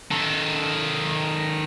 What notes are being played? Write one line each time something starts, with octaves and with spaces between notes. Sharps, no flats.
D#3 A4